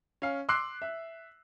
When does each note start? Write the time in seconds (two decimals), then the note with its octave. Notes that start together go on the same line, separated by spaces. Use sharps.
0.22 C#4 F5
0.49 C6 D6 E6 F#6 C7
0.82 E5